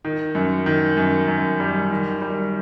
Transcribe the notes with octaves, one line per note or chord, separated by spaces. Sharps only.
D#3
F#2
D#3
F#2
F#2
G3
D#3
G3